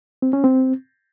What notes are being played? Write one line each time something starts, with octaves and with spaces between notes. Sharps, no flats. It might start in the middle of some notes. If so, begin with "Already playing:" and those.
C4
C#4
C4